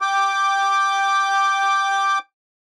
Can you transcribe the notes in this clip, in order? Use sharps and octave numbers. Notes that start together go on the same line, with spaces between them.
G5 D6